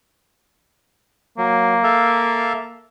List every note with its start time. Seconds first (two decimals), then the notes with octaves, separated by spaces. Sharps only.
1.38 F#3 A#3
1.83 A4 E5 F5